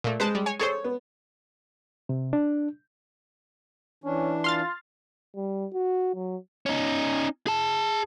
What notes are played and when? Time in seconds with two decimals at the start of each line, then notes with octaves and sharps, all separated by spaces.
0.04 A#2 A3
0.20 G#3 B4 C5 A5
0.35 G3
0.46 C#5 G#5
0.59 G#4 A4 C5 C#5
0.84 B3
2.09 C3
2.33 D4
4.04 E3 C#4 D4
4.44 F4 C6 F6 A6
5.36 G3
5.73 F#4
6.15 F#3
6.66 C#4 D#4
7.47 G#4 A5